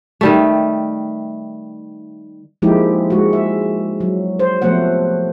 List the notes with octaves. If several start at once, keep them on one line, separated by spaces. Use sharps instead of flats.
D#3 G3 A3
F3 G#3 A#3 D#4 E4 G4
G#3 F#4
E5
F#3
C5
C3 F3 A3 B3 C5 F#5